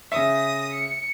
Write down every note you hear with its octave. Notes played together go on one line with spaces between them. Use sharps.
C#3 E5 D#6 A#6
C#7